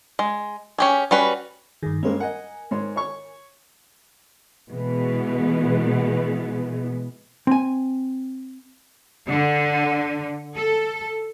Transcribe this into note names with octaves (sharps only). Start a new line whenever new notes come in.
G#3
C#4 G4 G#4
G3 C#4 F#4 B4
G2 D#3 G#4
G2 G#3 A#3 C#4 C5 C#5
A#4 D#5 F#5 G#5
G#2 C#5 C6
C#5 C#6
B2 E3 G#3 B3
C4 G#5
D3
A4